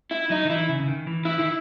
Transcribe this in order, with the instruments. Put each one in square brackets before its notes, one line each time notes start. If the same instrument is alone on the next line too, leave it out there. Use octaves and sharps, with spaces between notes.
[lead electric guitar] E4
[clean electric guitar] F#3 [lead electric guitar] D#4
[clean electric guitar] D#3
[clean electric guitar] E3 [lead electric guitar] E4
[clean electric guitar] C#3
C#3
D#3
E3
[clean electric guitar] E3 [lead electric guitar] E4
[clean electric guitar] D#3 [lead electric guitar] E4